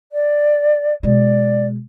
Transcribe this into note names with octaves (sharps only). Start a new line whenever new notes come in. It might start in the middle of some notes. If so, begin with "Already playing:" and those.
D5
B2 G#3 D5